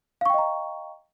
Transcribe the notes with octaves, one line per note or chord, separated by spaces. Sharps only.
D#5 F5 G5 A#5 C#6